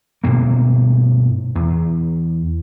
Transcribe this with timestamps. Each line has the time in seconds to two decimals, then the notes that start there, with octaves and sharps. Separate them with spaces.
0.24 G2 B2 A#3
1.55 E2